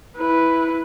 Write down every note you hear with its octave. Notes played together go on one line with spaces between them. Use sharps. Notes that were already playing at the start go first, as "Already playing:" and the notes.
E4 B4